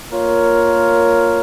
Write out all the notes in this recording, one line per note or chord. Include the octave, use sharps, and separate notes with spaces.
A#3 F4 A#4 C#5